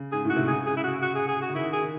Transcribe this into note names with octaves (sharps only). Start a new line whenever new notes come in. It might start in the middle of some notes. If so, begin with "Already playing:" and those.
Already playing: C#3
G#2 G#4
A2 F#4
C3
C#3 G#4
G#4
E4
F#4
F#4
G#4
G#4
F#4
C#3
D#3 E4
G#4
D#3